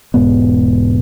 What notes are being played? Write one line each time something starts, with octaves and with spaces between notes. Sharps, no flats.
E1 G#2 B3